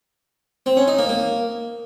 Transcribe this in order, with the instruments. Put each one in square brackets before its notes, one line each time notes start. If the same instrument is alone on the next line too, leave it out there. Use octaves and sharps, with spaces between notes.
[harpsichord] C4
C#4
D#4
A#3
A#3